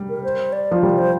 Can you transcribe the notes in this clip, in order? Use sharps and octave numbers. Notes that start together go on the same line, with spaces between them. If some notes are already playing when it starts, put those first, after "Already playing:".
Already playing: G3
A#4
C5
D5
F3
G3 D5
C5